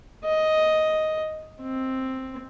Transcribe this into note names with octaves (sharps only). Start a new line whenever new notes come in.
D#5
C4